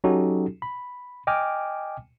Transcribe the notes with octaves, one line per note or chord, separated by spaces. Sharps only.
F#3 C#4 D#4 F#4 G4 A4
B5
D#5 G5 G#5 D6 F6